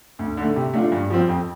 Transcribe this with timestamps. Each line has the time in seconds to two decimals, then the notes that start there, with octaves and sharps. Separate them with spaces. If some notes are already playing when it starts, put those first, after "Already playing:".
0.19 D2
0.37 D3 A3
0.56 C3
0.74 A3 D4 F4
0.92 G2
1.10 F3 C4
1.28 F2